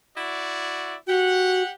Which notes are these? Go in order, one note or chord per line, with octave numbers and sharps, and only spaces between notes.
E4 F#4 D5
F#4 G4 F#5